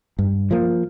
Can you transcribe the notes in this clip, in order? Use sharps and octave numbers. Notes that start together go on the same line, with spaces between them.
G2
F3 A#3